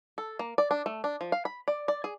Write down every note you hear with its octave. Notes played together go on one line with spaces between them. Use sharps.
A4
A#3
D5
D4
A3
D4
F3
F5
B5
D5
D5
G#4